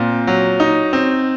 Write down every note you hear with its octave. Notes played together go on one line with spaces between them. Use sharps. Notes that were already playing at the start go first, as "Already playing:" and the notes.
Already playing: A#2 C4
F#3
D#4
C4